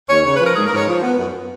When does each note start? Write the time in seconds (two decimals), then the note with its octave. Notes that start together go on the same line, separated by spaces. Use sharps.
0.09 D#2 C#5
0.24 C#3 C#5
0.35 B4
0.40 F3
0.46 A#4
0.56 G#2 G#4
0.66 A#4
0.72 G#2 C#5
0.87 F3
1.03 B3
1.18 F#2